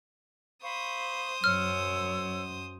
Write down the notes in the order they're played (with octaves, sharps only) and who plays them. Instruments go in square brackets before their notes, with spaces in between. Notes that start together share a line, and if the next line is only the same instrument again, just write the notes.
[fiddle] C5 D#6 [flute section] F5 B5 C#6
[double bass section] F#2 [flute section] C#5 E6 [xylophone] F6